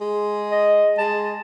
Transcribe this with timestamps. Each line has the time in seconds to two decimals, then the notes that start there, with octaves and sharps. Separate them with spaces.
0.01 G#3
0.52 D#5
0.98 G#3 A5